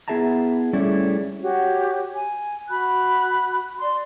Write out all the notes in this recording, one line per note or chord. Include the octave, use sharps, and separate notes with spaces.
B3 E4 G#4 E5 A5 A#5
G3 A3 C#4 E4 G#4 D5
F#4 G4 C#5
G#5
F#4 B5 F#6
D5 C6